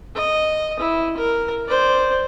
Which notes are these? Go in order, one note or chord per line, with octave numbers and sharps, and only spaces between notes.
D#5
E4
A#4
C5 D5